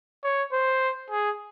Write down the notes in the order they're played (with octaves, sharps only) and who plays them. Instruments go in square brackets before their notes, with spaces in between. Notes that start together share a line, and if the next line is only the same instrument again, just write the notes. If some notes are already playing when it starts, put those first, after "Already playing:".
[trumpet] C#5
C5
G#4